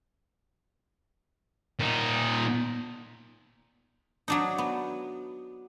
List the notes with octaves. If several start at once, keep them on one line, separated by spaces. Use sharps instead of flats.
A#2 D#4
F#3 D4 D#4
B3